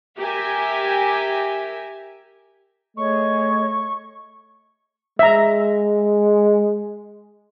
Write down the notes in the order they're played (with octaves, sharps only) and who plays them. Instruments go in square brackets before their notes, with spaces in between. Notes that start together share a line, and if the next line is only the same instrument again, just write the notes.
[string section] G4 A#4 E5 G#5
[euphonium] A3 [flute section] G#4 C#5 D#5 [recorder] C#6
[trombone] G#3 [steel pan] E5 A#5